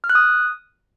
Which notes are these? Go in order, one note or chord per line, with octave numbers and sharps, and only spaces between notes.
F6
F#6
D#6